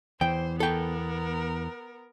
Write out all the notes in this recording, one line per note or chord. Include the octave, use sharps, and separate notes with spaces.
E2 E3 C5 G5
B3 A4 A#4 G5